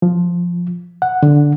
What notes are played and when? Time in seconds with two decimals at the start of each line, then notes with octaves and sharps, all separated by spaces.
0.02 F3
1.02 F#5
1.23 D3